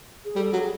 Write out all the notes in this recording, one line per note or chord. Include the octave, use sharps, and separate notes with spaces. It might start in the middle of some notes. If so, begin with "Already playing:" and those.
G#4
G3 A4
F#3 G#4